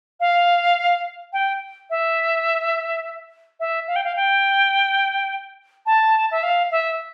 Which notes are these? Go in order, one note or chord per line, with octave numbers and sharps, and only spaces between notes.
F5
G5
E5
E5
F5
G5
F5
G5
A5
E5
F5
E5